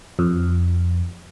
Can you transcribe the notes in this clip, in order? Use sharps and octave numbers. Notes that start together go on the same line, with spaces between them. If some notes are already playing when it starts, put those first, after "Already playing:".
F2